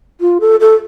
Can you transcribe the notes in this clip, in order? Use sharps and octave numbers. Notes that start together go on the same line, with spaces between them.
F4
A4
A4